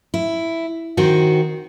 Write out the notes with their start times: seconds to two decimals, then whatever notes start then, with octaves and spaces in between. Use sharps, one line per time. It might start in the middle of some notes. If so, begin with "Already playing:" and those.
0.14 E4
0.97 D#3 C4 F#4